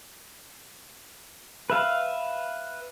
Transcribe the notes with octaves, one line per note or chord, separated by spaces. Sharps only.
B4 E5 F5